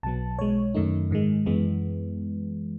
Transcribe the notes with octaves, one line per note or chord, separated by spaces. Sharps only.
B1 B2 F#3 B3 A5
B1 B2 G#3 C#5
F#2 D#3 A3 D#4
G#2 D#3 G#3
F#2 E3 G#3 B3